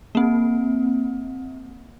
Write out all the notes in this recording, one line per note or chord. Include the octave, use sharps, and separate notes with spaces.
A#3 C4